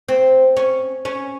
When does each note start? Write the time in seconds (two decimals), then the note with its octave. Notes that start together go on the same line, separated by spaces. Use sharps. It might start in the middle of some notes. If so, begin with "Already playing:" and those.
0.08 C4
0.57 C#4
1.05 C#4